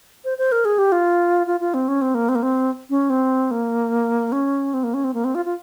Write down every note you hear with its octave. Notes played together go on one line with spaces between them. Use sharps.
C5
C5
A#4
G#4
G4
F4
F4
F4
C4
C#4
C4
A#3
C4
A#3
C4
C#4
C4
A#3
C#4
C4
A#3
C#4
C4
A#3
C4
F4
F4